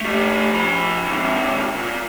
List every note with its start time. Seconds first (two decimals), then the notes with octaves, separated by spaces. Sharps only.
0.01 A3 G4
0.51 F3 B5
1.06 D#2 C3
1.75 A#2